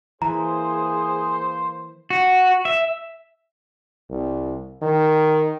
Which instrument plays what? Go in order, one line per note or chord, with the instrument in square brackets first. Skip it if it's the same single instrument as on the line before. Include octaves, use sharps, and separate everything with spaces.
[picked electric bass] E3 [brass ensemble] A#3 C5 [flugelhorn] G#4 [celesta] A#5
[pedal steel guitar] F#4
E5
[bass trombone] C2
D#3